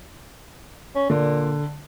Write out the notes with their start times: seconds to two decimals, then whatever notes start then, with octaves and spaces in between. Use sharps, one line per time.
0.95 C#4
1.10 A#2 D3